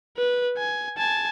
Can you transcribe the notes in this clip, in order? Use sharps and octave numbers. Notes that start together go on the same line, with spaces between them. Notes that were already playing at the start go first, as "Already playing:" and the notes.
B4
G#5
G#5 A5